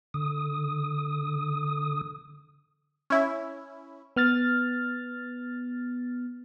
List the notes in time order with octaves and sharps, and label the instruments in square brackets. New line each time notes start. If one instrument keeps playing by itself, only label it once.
[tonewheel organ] D3 D#6
[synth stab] C#4 E4
[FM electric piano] B3 F6 A6